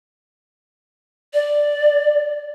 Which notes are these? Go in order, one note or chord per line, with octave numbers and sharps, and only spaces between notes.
D5